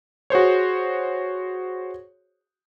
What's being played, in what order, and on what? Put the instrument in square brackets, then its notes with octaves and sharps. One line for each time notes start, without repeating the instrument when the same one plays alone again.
[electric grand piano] F#4 G#4 C5 C#5